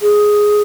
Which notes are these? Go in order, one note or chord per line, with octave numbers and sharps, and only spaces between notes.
G#4